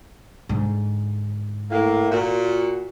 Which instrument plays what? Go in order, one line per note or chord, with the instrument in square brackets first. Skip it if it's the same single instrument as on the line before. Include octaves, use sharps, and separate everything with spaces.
[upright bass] G#2 D3
[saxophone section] A2 A#3
A#2 F#4